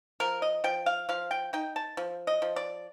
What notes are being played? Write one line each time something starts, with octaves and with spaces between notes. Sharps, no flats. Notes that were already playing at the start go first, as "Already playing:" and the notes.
F3 A#4
D#5
F3 G5
F5
F3 F5
G5
D#4 G5
A5
F3
D#5
F3
D5